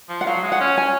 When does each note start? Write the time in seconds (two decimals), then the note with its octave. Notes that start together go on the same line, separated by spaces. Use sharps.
0.09 F3
0.21 F#5
0.27 F#3 F5
0.43 G#3
0.52 F#5
0.60 C#4
0.78 C#4 G#5